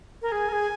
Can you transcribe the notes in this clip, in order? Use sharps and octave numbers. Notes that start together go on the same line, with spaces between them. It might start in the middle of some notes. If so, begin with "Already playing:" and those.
A#4
G#4 G#5
A#4
G#4